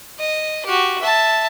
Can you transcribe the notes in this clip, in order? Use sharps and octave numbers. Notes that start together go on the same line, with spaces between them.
D#5
F#4 G4
E5 A5